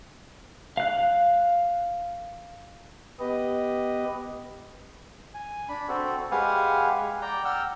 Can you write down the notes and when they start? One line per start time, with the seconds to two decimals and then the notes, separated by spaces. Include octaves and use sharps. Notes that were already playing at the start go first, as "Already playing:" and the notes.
0.77 F5 F#6
3.19 B3 G4 B4 D#5
5.34 G#5
5.69 D4 B5
5.88 C4 F#4 A4
6.31 G#3 G4 B4 F5 F#5 G#5
7.22 D5 G5 A#5
7.45 F#5 G5 E6 F6